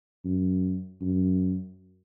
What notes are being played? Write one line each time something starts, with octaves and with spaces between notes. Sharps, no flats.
F#2
F#2